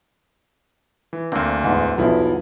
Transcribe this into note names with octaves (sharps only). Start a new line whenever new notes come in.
E3
D2 A#3 C4 D4
E2 G#2
B1 E2 F3 E4